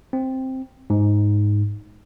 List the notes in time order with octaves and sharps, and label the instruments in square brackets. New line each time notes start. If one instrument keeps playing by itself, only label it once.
[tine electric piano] C4
G#2